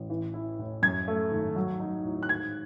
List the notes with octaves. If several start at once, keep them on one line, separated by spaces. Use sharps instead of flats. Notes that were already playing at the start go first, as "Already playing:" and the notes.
Already playing: A1
E3
E4
A2
F#2 G#6
A3
G#1
F#3
D#4
A2
F#6
G#2 G#6